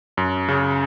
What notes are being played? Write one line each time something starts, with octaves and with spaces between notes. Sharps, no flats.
F#2
C#3